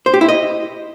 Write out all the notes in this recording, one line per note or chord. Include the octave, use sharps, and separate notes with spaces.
C5
G4
E4
D#5